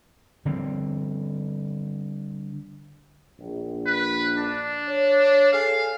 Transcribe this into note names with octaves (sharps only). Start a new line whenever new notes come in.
D3 F3 G3 C4
A#1
B4
D4
C#5
G#4 A4 F5 G#5